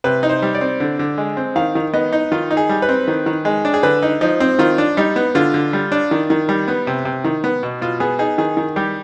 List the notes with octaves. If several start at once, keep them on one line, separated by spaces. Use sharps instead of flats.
C3 B4
D#4
C5
G3
D5
C4
D3
D3
G#3
C4
D#3 F5
D#3
B3 D#5
D#4
D#3 F4
D#4
G#4
G3
B4
C4
D#3
D#3
G#3
D4
G#4
D3 B4
D#4
F3 D#4
C4
D#3 F4
D4
G3 D#4
B3
D3 F4
D3
G3
D4
D#3
D#3
G3
B3
C3
C3
D#3
B3
B2
B2 F4
B3 G#4
D#4 G#4
D#3 G#4
D#3
G3 G4